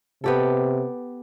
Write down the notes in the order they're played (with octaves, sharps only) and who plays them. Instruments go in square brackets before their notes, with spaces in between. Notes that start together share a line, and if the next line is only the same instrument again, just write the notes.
[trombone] C3 [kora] B3 G4 A4